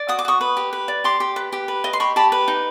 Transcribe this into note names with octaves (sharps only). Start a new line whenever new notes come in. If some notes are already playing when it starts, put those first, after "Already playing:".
Already playing: D5
F#4 D#6
D6
F#4 C#6 D#6
B4
G4
B4
D5
G4 C6 D6
G4
B4
G4
B4
D#5
C6
G4 B5 C#6
G4 A5 B5
B4
D#4